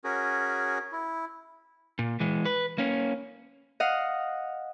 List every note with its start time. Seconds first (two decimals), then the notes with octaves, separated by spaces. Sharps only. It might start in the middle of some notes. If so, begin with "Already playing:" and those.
0.04 C#4 F#4 G#4 A#4
0.92 E4
1.99 A#2
2.20 E3 G#3
2.45 B4
2.78 A#3 C#4
3.80 D#5 F5 F#5